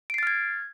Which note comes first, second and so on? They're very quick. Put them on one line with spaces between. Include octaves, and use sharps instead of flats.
D7 C7 A6 F6 G#6